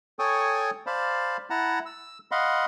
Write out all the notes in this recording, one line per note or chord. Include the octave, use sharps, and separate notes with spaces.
A4 C#5 G5 G#5 C#6 D#6
C5 D5 F5 A5 B5
E4 F#5 A5 A#5
E6
D#5 F5 F#5 B5 C6